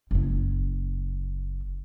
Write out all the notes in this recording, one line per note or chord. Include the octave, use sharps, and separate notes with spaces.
F#1 E4